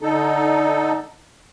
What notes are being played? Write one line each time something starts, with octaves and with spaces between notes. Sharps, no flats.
D3 D#4 A4